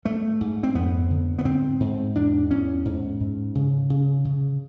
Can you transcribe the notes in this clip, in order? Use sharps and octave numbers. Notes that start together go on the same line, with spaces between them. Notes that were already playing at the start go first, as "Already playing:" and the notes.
G#2 A3
G#2
C4
F2 B3
D3
B3
G#2 C4
G#2
E2 D4
E2 C#4
G#2
G#2
C#3
C#3
C#3